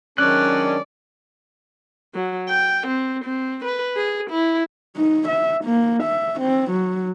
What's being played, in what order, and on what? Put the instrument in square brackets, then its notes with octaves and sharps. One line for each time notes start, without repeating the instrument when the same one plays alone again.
[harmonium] D#3 D4 [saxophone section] F#3 G#3 C#4 [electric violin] D5 [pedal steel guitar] F#6
[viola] F#3
G5
C4
C4
B4
G#4
E4
[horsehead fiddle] D#4
E5
A#3
E5
C4
F#3